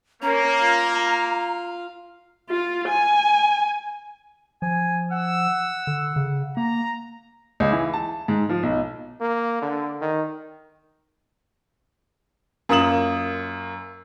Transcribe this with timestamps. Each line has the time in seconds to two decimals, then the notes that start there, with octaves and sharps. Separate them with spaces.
0.22 A#3 C#4 A#4 A#5
0.58 F4 F5
2.50 F4
2.88 G#5
4.62 F3 G#5
5.12 F#5 E6
5.87 D3
6.16 C#3
6.57 A#3 A#5
7.60 C#2
7.72 E3
7.94 A5
8.28 G#2
8.49 F3
8.63 B1
9.21 A#3
9.62 D3
10.01 D#3
12.69 F#2 A#3 F4 D#6 E7 F#7